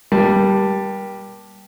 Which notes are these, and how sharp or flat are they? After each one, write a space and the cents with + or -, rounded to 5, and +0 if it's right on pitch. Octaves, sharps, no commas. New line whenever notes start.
G3 +0 A#3 +35 A5 +0